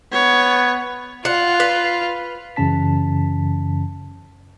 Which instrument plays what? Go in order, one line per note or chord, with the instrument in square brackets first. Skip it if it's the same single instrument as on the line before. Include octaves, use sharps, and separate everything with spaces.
[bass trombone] B3 [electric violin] C#5
[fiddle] F4 [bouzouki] F#5
[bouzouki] B4
[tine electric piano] F#2 C#3 E3 C#4 A5 B6